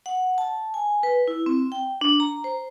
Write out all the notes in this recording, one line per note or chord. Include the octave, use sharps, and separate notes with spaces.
F#5
A5
G#5
B4
E4
C4
G5
D4
A#5
C5